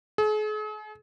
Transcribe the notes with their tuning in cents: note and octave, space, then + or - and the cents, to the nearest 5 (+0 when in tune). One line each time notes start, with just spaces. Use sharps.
G#4 +45